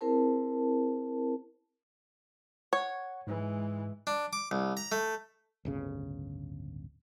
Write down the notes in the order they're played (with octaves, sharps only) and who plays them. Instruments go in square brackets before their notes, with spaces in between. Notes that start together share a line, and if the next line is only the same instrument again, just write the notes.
[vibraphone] C4 E4 G#4 A#4 C5 A5
[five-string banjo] C#5 [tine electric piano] F#5 C#6
[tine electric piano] G#2 [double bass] E3 G#3
[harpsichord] D4
D6
C2
A#5
A3
[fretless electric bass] D1 G1 C#3